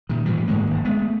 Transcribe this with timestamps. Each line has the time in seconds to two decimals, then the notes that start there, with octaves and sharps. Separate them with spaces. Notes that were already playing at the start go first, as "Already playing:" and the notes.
0.09 A#2 D#3
0.26 A2 E3 F3 G3
0.47 G#2 D#3 G#3 A#3
0.71 F1
0.85 G#3 A3 B3